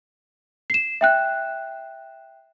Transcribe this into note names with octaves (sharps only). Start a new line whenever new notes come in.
C7 E7
E5 G5 F#6